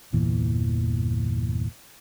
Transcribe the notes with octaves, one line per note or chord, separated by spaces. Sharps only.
G1 E2 A#2 E3